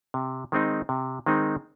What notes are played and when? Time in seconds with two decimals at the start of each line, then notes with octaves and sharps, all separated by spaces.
0.14 C3
0.52 D#3 G#3 C4 D#4
0.89 C3
1.26 D#3 G#3 C4 D#4